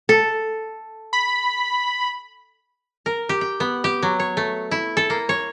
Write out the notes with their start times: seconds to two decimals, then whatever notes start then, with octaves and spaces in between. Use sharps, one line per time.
0.09 A4
1.13 B5
3.06 A#4
3.29 G4
3.41 G5
3.60 B3
3.84 G4
4.03 F#3
4.20 C#5
4.37 A3
4.71 E4
4.97 A4
5.10 A#3
5.29 C#5